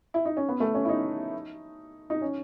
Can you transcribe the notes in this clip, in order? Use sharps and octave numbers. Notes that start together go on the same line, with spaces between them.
E4
D#4
C#4
B3
A3
C#4
E4
D#4
D#4
C#4